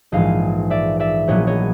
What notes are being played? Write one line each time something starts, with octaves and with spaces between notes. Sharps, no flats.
A#1 G#2 E3 G#3 D#5 F5
D5 E5
D5 E5
A#1 A#2 F#3 B3 C#5 D#5
C#5 D#5